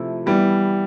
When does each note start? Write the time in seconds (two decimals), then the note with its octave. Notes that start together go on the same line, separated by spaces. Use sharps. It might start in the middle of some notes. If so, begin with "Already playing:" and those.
Already playing: C3 F3 A3 E4
0.26 E3 G3 B3 E4